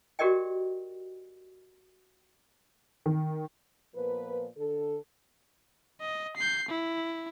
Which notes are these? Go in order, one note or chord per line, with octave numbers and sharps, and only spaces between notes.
F#4 G4 A#4 D5 D#5 G5
D#3
A#2 F3 B3 A#4 B4
D3 A4
D#5
G6 C7
E4